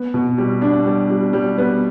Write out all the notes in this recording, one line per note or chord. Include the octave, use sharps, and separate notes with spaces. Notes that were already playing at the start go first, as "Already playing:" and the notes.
Already playing: B3
B2
G3
D4
G3
G3
G3
B3